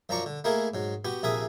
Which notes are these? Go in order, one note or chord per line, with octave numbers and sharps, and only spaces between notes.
F#2 F3 D4 D5 A#5 C#6
D3
A3 A#3 D#4 E4 G#4 A#4
G#2 F#3
B3 F#4 G4
A#1 C3 G#4 A#4 E5 D#6